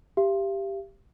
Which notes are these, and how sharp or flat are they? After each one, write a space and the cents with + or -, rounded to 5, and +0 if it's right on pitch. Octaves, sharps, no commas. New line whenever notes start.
G4 +0 F5 -45